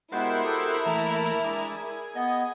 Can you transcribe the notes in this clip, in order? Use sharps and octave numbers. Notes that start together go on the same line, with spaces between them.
G#3 B3 E4 F#4 G4 A#4 C5
A4 D6 D#6
E3 A3 A#3 A#5
G#3 D4
G#4
B3 D#5